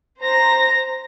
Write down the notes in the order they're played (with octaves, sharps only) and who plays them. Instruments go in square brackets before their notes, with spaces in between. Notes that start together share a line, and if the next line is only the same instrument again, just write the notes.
[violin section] C5 A#5 A#6